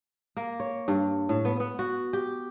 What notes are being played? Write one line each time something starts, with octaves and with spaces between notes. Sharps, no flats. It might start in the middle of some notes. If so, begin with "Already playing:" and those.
A#3
C#5
G2
A2
B3
B3
F#4
G4